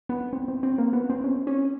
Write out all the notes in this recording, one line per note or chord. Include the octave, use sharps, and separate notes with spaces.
B3
C4
C4
C4
A#3
B3
C4
C#4
C#4